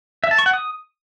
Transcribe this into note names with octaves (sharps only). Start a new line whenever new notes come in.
E5
A5
C#6
F#5
D#6